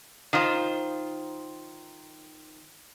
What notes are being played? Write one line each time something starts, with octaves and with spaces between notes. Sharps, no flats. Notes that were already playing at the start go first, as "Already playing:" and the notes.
D#3 F4 C5